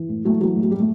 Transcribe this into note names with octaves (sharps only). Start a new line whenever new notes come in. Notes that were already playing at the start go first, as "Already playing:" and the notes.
Already playing: E3
A2
A2 F#3 A3
E3 F#3 A3
A2
F#3
A2 G3
A3